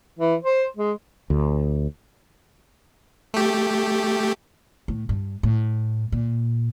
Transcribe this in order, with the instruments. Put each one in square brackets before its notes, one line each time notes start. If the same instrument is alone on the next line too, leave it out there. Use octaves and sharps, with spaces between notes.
[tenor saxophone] E3
C5
G#3
[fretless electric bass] D2
[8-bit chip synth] A3 G4
[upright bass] A2
G2
A2
A#2